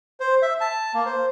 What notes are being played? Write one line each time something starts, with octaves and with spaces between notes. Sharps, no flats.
C5
E5
A5
A#3
C5